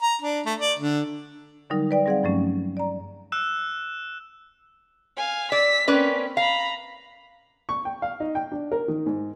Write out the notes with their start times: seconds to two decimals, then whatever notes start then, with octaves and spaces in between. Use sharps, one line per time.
0.02 A#5
0.22 D4
0.46 A3
0.59 D5
0.79 D3
1.70 D3 F#3 G3 D#4 A#4
1.91 B4 D5 G5
2.06 G3 C4 G#4 D5 F5 F#5
2.23 G2 F3 F#3 A3 C#4
2.77 D5 A#5
3.32 E6 F#6 E7
5.17 F5 G#5
5.52 D5 E6 B6
5.88 A#3 C4 C#4 B4 D5
6.37 F5 A#5 B5
7.69 C#6
7.85 G5
8.02 F5
8.20 D#4
8.35 G5
8.52 D4
8.72 A#4
8.88 D#3
9.06 G#2